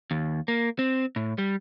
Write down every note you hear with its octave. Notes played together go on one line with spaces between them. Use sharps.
D#2
A#3
C4
A2
G3